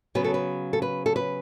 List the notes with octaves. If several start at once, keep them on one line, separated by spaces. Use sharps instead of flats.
C#3 F#3 B3 B4
A4
B4
A4
B4
A4
B4